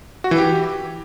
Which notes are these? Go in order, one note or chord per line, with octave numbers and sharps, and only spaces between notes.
F#4
E3
G4